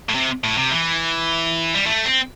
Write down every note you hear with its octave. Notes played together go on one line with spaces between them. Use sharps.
A2
C3
A2
C3
E3
G3
A3
C4